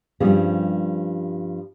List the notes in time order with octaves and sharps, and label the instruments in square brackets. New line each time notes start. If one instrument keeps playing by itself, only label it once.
[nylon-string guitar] G2 F3 G3 C4 C#4 G#4